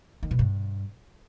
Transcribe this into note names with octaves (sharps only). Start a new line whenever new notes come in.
D#3
B2
G2